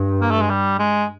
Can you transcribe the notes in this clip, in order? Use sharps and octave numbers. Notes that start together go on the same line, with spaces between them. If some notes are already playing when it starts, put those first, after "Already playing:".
Already playing: G2
A#3
A3
G#3
G3
G#3